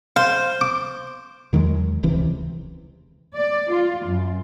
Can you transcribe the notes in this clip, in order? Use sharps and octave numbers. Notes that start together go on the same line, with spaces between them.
C5 F5
D6
E2 D#3 F#3 G#3
D#1 C#2 C3 E3
D5
F4
F#2